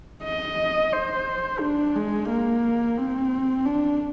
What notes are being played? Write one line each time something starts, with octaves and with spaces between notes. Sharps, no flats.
D#5
C5
D4
G#3
A#3
C4
D4